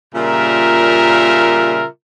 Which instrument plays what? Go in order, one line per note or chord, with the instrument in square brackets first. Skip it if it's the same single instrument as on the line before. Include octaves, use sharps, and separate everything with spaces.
[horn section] A#2 C#3 G3 F4 A#4 E5